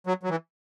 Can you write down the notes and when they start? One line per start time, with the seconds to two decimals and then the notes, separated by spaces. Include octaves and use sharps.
0.07 F#3
0.23 F#3
0.29 E3